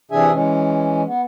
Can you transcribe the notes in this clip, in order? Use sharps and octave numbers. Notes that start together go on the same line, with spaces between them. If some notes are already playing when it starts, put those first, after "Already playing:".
C3 E3 D4 G#4 E5 G#5
E3 G#3 C#4
B3